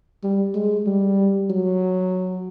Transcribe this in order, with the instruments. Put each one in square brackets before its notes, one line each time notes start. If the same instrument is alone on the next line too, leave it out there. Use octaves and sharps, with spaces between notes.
[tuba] G3
G#3
G3
F#3